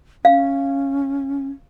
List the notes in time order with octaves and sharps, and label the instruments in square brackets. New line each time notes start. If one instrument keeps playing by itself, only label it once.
[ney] C#4 [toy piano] F5